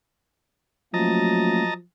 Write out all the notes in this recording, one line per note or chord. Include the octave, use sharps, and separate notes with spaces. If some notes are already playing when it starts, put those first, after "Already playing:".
F3 F#3 A3 A#3 C#4 D#5 A5 A#5